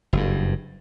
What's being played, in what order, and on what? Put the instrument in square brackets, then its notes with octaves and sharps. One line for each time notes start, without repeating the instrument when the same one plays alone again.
[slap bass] F#1 G2